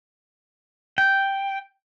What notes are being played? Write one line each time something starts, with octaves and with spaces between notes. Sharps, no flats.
G5